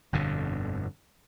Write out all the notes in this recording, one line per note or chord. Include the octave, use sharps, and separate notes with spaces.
G1 F2 B2 D3